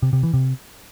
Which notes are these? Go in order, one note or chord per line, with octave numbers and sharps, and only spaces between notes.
C3
C3
E3
C3